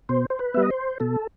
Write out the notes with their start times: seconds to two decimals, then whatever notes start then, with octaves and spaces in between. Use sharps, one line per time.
0.09 B2 C5
0.30 C5
0.39 B4
0.54 B3 E5
0.57 G3
0.63 D#5
0.71 C5
1.00 B2 A4